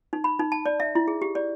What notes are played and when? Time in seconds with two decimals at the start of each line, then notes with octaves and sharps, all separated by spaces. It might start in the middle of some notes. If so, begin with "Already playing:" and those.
0.13 D#4
0.24 B5
0.39 D#4
0.52 A5
0.66 D5
0.80 E5
0.95 E4
1.08 G#4
1.22 G4
1.35 D5